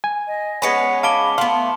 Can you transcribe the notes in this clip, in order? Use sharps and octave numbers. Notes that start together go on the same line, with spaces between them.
G#5
D#5
G#3 B3 C#4 D#5 F#5 B5 B6 C#7
F5 A5 B5 D6 D7 G7
A3 B3 F5 C6